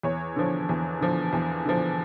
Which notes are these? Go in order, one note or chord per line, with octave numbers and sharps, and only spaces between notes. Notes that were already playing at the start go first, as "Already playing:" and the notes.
E2 C#5
D3 F3
E2
D3 F3
E2
D3 F3